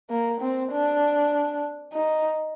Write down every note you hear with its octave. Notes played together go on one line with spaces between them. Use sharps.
A#3
C4
D4
D#4